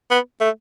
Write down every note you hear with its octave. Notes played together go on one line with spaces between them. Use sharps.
B3
A3